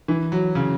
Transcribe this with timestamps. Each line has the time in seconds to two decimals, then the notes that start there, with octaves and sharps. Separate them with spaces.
0.08 E3
0.32 F#3
0.55 C#3